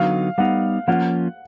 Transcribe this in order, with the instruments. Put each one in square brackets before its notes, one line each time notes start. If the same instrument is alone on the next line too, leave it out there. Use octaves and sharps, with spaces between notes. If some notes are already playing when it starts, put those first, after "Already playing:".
Already playing: [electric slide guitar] D3 F#3 B3 D#4 F#4 [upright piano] F5
[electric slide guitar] G3 B3 D#4 [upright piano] F#5
[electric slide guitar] F3 A#3 C#4 F4 [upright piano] F#5